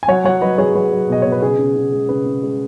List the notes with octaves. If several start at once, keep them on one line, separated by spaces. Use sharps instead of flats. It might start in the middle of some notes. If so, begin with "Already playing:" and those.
G#5
F#3 C#5 F#5
F#3 C#5 F#5
F#3 B4 D#5
F#3 G#4 C#5
F#3 B4
F#3
B2 D#5
B2 C#5
B4
C#3 G#4
C#3
C#3
G#3
C#3 B4
C#3
G#3